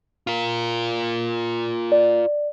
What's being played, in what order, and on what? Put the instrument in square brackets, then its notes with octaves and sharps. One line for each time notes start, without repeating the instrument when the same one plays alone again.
[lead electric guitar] F4 A#4
[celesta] D5